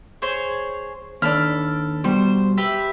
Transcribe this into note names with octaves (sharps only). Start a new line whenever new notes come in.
G#4 C5 C#5
D#2 D4 A4 B4 F6
B2 G3 C5
G4 B4 E5